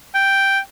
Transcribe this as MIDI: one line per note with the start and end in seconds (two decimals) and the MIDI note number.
0.15 0.59 79